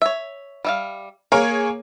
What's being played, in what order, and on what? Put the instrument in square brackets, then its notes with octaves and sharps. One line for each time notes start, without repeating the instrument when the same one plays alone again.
[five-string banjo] C#5 E5
G3 E5 F5
[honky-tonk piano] A#3 G#4 C#5 [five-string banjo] A#4